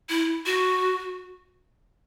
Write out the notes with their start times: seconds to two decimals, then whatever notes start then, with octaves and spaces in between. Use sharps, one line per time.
0.09 E4
0.46 F#4